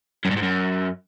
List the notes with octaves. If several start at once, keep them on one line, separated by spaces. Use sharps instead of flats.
F#2
G2
G#2
F#2